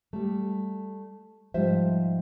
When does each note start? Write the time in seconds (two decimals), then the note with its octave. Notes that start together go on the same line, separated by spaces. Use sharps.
0.13 G3 A3
1.54 G#2 F3 G3 F4 C5 E5